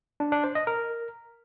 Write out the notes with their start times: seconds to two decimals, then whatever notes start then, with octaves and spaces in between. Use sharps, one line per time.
0.20 D4
0.32 D4
0.44 C5
0.55 D#5
0.67 A#4